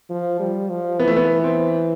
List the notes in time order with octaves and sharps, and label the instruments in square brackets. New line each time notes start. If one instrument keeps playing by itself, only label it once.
[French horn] F3
G3
F3
[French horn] E3 [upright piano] B3
[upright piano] A3
B3
C4